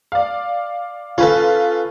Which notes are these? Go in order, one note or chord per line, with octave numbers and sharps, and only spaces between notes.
D5 F5
C#4 F4 A4 B4